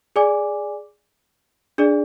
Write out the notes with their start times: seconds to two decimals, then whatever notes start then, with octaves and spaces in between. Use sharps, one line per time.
0.16 G#4 D5 G#5 D6
1.78 D4 G#4 D5